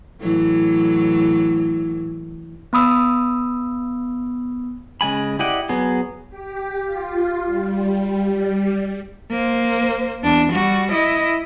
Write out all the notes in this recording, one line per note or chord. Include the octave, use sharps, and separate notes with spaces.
A2 E3 F#3
B3 B5 D#6 E6
C#3 G#3 G#5 B5
E4 G4 D5 D#5 F#5
F#3 B3 G#4
G4
F4
G3
A#3 C5
E2 D4
G3 F#4
E4 D#5